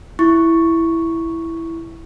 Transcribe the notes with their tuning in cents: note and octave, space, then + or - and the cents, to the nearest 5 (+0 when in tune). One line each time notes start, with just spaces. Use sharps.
E4 +0 C#6 +0